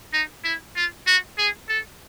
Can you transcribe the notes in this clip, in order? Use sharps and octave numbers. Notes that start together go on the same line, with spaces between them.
D#4
E4
F4
F#4
G#4
A4